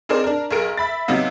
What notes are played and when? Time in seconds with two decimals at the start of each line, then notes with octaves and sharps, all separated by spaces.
0.09 C4 D#4 G#4 A#4 C5 D5
0.24 D4 A#4
0.51 B1 G#4 A#4 D7
0.77 E5 B5 A6
1.08 C3 F#3 B3 D#4 F5